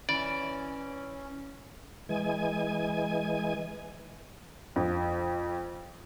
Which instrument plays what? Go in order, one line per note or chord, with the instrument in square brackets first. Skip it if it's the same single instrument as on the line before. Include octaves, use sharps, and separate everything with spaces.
[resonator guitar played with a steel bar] E3 [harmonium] C#4 [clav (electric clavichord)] D5
[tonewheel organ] E3 G#3 G#5
[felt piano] F2